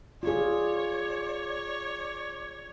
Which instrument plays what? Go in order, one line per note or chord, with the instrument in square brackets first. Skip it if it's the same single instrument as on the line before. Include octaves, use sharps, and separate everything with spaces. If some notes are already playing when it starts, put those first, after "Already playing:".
[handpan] F4 G#4 [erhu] C#5 [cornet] D5